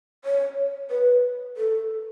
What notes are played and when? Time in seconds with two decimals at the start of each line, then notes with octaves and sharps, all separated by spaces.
0.25 C#5
0.91 B4
1.57 A4